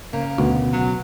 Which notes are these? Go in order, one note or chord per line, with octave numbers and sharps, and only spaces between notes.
C#3 A#3
D2 B2 B3
F#3